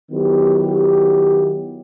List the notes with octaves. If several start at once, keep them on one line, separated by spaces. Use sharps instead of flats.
D#3 F#3 B3 E4 G4